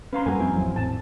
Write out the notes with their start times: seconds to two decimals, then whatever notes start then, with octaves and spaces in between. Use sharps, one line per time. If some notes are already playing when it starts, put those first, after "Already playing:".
0.13 C#4 B4 F5 A#5 C6
0.26 F#2 G3 A#3 F#4 A4 A#4 G#5
0.40 F2 C4 E4
0.55 G#1 E2 F#3
0.76 A2 A5